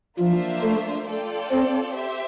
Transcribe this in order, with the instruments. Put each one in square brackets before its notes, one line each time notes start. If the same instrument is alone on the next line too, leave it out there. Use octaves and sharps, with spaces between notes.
[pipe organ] F3 [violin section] A#3 D4 F4 C5 E5
[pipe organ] A3
[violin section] F4 A4 D5 G5
[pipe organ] C4
[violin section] G4 C5 E5